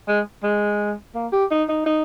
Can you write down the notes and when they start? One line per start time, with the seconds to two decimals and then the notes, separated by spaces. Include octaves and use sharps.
0.08 G#3
0.43 G#3
1.15 A#3
1.32 G4
1.51 D#4
1.69 D#4
1.86 D#4